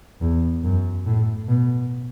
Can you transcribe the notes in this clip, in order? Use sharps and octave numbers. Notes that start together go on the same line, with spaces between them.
E2
F#2
A2
B2